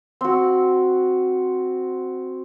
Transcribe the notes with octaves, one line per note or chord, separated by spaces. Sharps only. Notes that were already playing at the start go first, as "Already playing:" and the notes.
C4 F#4